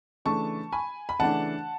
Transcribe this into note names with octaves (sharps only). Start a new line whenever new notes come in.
C#3 E3 A3 D4 A5 C#6
G#5 B5
B5
C#3 E3 A3 D4 F#5 A5